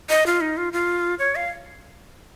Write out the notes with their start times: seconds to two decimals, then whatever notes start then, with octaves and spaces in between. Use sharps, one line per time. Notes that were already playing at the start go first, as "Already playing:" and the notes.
0.10 D#5
0.26 F4
0.41 D#4
0.57 F4
0.73 F4
1.19 C#5
1.36 F5